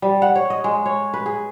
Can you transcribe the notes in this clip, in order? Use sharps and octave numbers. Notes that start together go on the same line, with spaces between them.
G3
F#5
C#5
D#5
G#3
C#5
B4
G#4